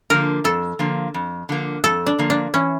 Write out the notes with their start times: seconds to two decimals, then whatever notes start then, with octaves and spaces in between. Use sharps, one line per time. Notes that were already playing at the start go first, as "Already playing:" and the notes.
0.10 D3 F3 A#3 A#4
0.44 F2 A4
0.79 D3 F3 A#3
1.14 F2
1.49 D3 F3 A#3
1.84 F2 A4
2.06 D4
2.19 D3 F3 A#3
2.30 D4
2.54 E3 C#4